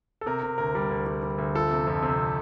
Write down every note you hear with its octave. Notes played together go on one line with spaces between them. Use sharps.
A4
C3 A#4
C3
D2 A#4
G3
D2
G3
G3
D2
F3 A4
C3
F2
C3